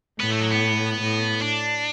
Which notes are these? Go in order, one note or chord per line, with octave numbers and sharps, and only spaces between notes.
A2 B3
A3
F#3
B3
A2
D4